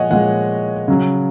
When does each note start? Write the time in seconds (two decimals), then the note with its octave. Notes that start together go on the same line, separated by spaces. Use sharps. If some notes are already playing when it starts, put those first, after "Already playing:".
Already playing: A#2 F3 G#3 C#5 D#5 F#5 G#5
0.10 A#2 F3 G#3 F#5
0.88 C#3 F#3